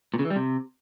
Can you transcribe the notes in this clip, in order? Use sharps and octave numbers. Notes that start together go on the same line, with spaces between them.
A#2
C#3
E3
G3
C3